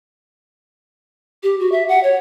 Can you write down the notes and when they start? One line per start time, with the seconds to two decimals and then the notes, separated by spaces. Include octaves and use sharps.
1.43 G4
1.59 F#4
1.72 E5
1.89 F#5
2.03 C#5